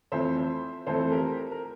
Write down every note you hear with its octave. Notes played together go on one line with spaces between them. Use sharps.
F2 E3 A3 C4 C5 E5
F2 E3 A3 C4 A4 C5
A4
G4 A#4
A#4